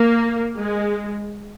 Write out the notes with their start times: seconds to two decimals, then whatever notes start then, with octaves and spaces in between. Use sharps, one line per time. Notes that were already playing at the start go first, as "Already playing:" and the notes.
Already playing: A#3
0.59 G#3